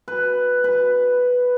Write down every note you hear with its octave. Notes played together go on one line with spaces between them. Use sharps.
B4
B4